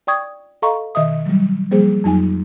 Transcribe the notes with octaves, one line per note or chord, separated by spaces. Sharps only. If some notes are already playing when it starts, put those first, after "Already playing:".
D5 G5 C#6 D#6 G#6
A4 D#5 F5 A#5 C6 C#6
B2 D#3 D#5 E5 D#6
F#3 G3
F3 G3 A#3 G#4 C5
F2 F#3 D#4 G#5